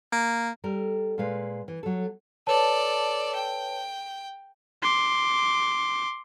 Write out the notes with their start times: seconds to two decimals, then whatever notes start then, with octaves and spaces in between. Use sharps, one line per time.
0.12 A#3
0.64 G3 A4 A#4
1.18 A#2 G#3 B4 F5
1.68 E3
1.83 F#3 A4
2.47 A4 B4 C#5 D5 A5
3.35 G5
4.82 C6 D6